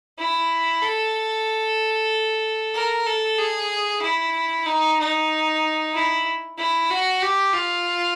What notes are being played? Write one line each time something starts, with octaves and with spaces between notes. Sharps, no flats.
E4
A4
A#4
A4
G#4
E4
D#4
D#4
E4
E4
F#4
G4
F4